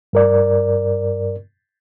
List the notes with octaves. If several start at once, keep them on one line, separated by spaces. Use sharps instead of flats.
G2 A#4 D5